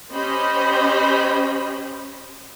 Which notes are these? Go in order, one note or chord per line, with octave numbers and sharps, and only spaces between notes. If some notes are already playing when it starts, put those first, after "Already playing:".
C#4 G4 C5 D#5 B5